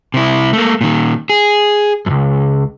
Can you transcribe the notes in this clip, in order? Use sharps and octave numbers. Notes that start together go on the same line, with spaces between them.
C3 E4
A3 A#3
A#2 D#3
G#4
C#2 F#2